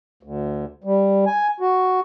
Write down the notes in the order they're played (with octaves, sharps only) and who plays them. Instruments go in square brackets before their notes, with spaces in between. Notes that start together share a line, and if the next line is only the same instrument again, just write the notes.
[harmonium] D2
G3
G#5
F#4